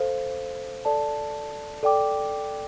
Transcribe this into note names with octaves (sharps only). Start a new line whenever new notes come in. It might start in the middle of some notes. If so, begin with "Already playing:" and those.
Already playing: A4 C5 F5
A4 D5 A5
A4 D5 G5 D6